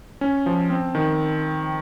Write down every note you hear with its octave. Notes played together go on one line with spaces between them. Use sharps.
C#4
F3
C4
D#3